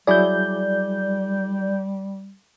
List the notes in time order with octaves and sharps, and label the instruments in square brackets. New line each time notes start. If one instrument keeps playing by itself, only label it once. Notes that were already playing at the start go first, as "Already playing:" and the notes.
[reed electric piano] F#3 E4 G#4 [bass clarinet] G3 [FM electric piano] D5 G6